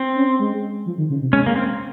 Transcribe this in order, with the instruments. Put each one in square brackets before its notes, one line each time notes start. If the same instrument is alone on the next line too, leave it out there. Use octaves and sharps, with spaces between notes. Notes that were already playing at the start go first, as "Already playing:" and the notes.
Already playing: [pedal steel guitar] C4
[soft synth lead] C#4
G#3
F3
D#3
C#3
C3
[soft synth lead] G#3 [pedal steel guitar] C#4
[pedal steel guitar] A#3
C4